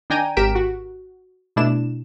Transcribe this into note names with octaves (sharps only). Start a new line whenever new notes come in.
D#3 D4 G5 G#5 A#5 D#7
G#1 G4 A#4 B6 D7 E7
F#4
B2 A3 D4 E4 E7